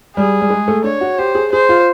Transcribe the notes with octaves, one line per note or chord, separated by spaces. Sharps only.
G3 G#4
G3
G#3
A3
D4 C#5
F#4
G4 C5
G#4
G#4 C5
F4